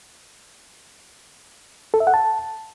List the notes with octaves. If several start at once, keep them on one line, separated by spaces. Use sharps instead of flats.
A4
E5
F#5
A5